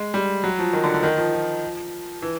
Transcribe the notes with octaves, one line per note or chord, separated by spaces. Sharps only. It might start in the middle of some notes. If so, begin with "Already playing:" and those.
Already playing: G#3
G3
F#3
F3
D#3
D3
D3
D#3
F3
F3
E3